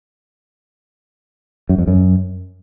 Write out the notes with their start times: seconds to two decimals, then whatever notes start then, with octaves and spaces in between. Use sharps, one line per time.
1.69 F#2
1.78 F2
1.87 F#2